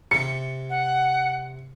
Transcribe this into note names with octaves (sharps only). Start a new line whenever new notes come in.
C3 G4 C#7
F#5